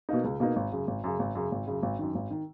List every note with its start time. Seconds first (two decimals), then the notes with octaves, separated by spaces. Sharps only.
0.09 B2 A#3 D#4
0.24 C#2
0.40 B2 A#3 D#4
0.56 G#1
0.72 F#2 C#3
0.87 G#1
1.04 F#2 C#3
1.19 G#1
1.35 F#2 C#3
1.52 G#1
1.67 F#2 C#3
1.83 G#1
1.99 F#2 D#3
2.15 G#1
2.30 D#3